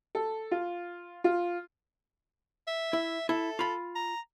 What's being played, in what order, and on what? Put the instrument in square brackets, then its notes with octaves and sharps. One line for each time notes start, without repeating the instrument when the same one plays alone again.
[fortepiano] A4
F4
F4
[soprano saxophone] E5
[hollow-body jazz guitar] E4
[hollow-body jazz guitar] E4 [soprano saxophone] A4
[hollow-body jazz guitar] F4 B5
[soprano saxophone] A#5